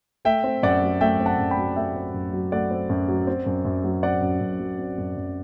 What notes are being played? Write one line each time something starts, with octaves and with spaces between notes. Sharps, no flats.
A3 E5 G5
C4
F#2 D5 F#5
F#3
A3 E5 G5
C4
F#5 A5
F#2
G5 B5
F#3
A3 E5 G5
C4
F#2
F#3
A3 D5 F#5
C4
F#2
F#3
C4
F#2
F#2
F#3
C4 D5 F#5
F#2
F#2
F#3
C4
F#2
F#2